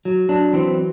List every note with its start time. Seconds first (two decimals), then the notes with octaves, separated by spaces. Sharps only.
0.05 F#3
0.29 F#3 D4
0.53 E3 C4